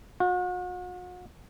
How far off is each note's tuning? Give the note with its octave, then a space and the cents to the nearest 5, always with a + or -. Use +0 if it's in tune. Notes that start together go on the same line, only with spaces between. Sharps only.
F#4 -40